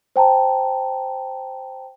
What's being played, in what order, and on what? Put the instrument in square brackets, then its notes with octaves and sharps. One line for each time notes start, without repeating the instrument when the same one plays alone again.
[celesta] C5 G5 A5 A#5